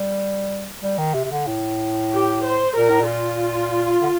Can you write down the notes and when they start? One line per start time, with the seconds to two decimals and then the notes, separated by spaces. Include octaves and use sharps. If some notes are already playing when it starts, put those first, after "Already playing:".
Already playing: G3
0.83 G3
0.98 D#3
1.14 C3
1.25 C3
1.31 D3
1.47 A2
2.12 G4
2.44 C5
2.77 A#2 A#4
2.90 A2
3.01 A#2
3.10 F4
4.02 D3